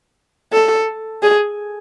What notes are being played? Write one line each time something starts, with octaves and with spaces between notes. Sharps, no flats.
A4
G#4